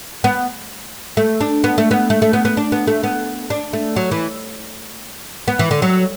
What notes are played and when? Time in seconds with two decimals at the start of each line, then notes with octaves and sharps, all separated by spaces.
0.24 B3
1.17 A3
1.41 D4
1.64 B3
1.78 A3
1.91 B3
2.10 A3
2.22 A3
2.33 B3
2.45 B3
2.57 D4
2.72 B3
2.87 A3
3.03 B3
3.50 D4
3.73 A3
3.96 F#3
4.11 E3
5.48 B3
5.59 E3
5.71 D3
5.82 F#3